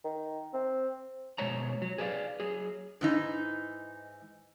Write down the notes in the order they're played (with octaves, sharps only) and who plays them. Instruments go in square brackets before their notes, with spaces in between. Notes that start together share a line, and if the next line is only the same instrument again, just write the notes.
[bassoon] D#3
C4
[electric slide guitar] B2 G#3 C5 C#5 A#5
F#3
G#4 B4 C5 D5 F5
F#3 G#4
[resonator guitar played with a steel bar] G#2 E3 D#4